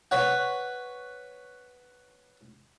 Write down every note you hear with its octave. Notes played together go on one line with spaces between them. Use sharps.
B4 C#5 F#5